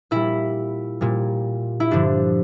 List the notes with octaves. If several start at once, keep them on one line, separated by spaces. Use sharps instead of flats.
A#2 G3 E4
A#2 G3
E4
G2 D3 F3 D4